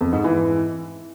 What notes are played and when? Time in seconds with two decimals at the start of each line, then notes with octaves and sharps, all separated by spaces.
0.01 F2
0.12 G#2
0.24 E3